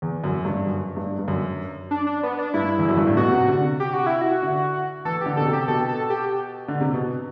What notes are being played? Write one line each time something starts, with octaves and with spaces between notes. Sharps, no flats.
E2
F#2
G2
F#2
G2
G2
F#2
D4
D4
B3
D4
G2 E4
E2
F#2
G2
A2
B2 F#4
C3
D3
C3
G4
F#4
E4
F#4
D3
E3 A4
D3 G4
B2 A4
C3
G4
B2 A4
A4
G4
D3
C3
B2